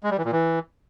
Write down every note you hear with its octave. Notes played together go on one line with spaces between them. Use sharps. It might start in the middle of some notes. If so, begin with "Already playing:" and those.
G#3
G3
E3
A#2
E3